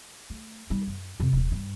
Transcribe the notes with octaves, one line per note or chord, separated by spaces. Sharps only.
A3
G3 D#4
F#2
F2 C3
D#1 E3
G2